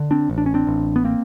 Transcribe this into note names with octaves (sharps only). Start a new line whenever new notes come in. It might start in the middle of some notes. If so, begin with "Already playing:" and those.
Already playing: D3
C4 D4
A1
D4
C#4
C4 D4
A1
B3
A#3 C4